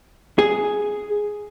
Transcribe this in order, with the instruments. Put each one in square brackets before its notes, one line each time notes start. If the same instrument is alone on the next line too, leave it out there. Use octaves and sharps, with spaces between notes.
[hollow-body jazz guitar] G#4